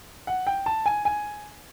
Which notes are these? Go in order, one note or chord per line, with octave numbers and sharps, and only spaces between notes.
F#5
G5
A5
G#5
G#5